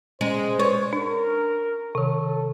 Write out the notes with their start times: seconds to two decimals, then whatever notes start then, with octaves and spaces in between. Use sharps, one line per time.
0.21 G#3 C#4 C5
0.59 B4 C#5
0.93 D4 A#4
1.95 C3 D#3 A4